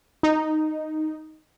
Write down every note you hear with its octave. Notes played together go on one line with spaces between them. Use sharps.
D#4